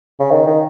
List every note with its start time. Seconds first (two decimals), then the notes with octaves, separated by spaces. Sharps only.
0.20 C#3
0.31 D#3
0.47 D#3